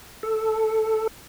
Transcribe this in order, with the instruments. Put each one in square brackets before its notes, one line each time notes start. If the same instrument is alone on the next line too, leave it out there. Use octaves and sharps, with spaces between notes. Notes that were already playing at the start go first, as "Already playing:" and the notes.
[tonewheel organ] A4